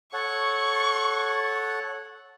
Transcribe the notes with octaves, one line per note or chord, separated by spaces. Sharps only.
A4 C#5 F#5 C#6